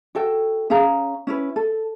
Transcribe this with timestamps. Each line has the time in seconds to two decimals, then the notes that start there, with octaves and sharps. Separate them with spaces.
0.15 F#4 A4 G5
0.70 C#4 G#4 F5 A#5
1.27 C#4 E4 B4
1.56 A4